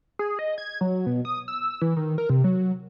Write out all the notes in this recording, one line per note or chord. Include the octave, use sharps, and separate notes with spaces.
G#4
D#5
G#6
F#3
B2
D#6
E6
E3
D#3
A#4
C3
F#3